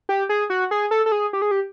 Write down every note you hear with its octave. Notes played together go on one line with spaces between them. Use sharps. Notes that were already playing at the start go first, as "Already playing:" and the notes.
G4
G#4
F#4
G#4
A4
A4
G#4
G4
G#4
G4